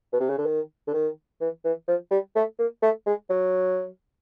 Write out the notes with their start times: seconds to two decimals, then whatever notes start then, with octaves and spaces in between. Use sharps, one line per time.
0.13 B2
0.20 C3
0.30 C#3
0.38 D3
0.46 D#3
0.87 D3
0.93 D#3
1.41 E3
1.65 E3
1.88 F3
2.11 G3
2.36 A3
2.59 A#3
2.82 A3
3.06 G#3
3.30 F#3